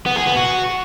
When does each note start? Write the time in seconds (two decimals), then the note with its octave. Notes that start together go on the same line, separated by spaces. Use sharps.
0.06 B3
0.16 G#4
0.27 B3
0.37 F#4